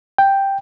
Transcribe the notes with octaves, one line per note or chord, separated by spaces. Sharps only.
G5